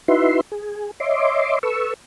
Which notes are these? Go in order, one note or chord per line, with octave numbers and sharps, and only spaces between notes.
D#4 E4 F#4 B4 E5 C6
G#4
C#5 D#5 E5 C6 D6
A4 B4 C#6 E6